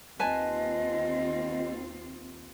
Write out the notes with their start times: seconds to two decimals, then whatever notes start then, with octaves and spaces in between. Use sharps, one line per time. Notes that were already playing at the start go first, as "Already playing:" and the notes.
0.19 D#2 C4 F4 B4 D#5 G#5 A5